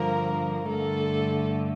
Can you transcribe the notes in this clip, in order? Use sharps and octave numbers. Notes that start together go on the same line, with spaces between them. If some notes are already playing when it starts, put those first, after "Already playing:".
Already playing: G2 D3 F3 A#3 A#4
G2 D3 A3 A4